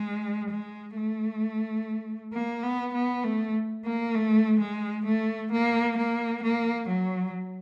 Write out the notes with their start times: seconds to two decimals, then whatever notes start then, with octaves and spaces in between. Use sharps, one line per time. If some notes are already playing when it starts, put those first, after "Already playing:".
Already playing: G#3
0.50 G#3
0.96 A3
2.33 A#3
2.63 B3
2.94 B3
3.24 A3
3.85 A#3
4.15 A3
4.60 G#3
5.06 A3
5.52 A#3
5.98 A#3
6.43 A#3
6.89 F#3